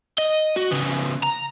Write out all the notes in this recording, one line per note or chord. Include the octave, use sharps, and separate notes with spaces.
D#5
F#4
C#3 B3
A#5